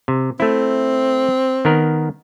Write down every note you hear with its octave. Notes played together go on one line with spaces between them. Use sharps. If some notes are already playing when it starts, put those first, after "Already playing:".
C3
A3 C4 E4
D#3 B3 A#4